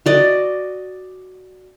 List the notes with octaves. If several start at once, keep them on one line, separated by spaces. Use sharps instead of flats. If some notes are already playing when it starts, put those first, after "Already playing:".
F#4 D5 D#5